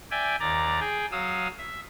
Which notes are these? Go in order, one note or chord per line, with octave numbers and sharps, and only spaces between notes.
D5 E5 G5 G#5
D#2 D5 A#5 A6
G#4 G5
F#3 F5 D#6 E6
E5